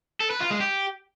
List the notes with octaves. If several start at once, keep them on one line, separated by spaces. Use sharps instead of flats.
A4
B4
F4
G#3
G4